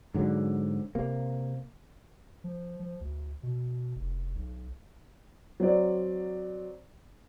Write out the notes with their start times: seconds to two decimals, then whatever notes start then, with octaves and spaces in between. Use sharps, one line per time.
0.14 G#2 D3 F#3
0.95 C3 A#3
2.44 F3
2.80 F3
3.01 D2
3.43 B2
3.96 F1
4.36 B1
5.60 F#3 C4 D5